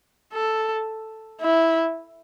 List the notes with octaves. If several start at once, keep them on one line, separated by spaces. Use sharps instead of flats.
A4
E4